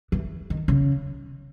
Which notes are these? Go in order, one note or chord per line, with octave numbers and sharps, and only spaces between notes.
E3
D#3
C#3